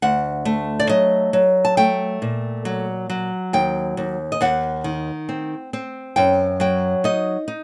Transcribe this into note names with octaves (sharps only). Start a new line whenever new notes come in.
D2 F#5
A3
D5
F#3 D#5
F#3
A5
A3 G5
A#2
F#3
F#3
D#2 G5
D#2
D#5
D#2 F#5
D#3
C4
C4
F#2 G5
F#3 G5
D#4 D#5
D#4